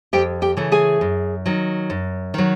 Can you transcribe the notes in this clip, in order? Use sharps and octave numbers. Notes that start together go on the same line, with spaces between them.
F2 G4 G5
G4 G5
C#3 E3 A3
G#4 G#5
F#2
D#3 F#3
F#2
D#3 F#3